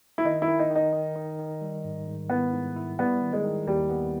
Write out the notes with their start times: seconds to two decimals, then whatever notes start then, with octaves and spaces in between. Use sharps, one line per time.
0.18 E4
0.25 D#3 D#4
0.42 E4
0.48 D#3
0.59 D#4
0.70 D#3
0.76 D#4
0.93 D#3
1.16 D#3
1.39 D#3
1.62 G3
1.84 G#2
2.07 G#2
2.30 B3 E4
2.53 G#2
2.76 E4
2.98 G3 B3
3.21 D#3
3.33 G#3
3.44 D#3
3.67 D#2 G3
3.90 B3